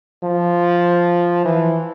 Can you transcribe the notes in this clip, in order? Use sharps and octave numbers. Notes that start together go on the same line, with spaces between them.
F3
E3